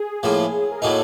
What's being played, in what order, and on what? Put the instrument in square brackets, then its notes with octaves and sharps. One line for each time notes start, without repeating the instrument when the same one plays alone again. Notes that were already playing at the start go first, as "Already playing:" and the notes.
Already playing: [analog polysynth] G#4
[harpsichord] A2 F3 A#3
[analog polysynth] A#4
[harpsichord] A2 F#3 A#3 D#4 [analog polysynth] A4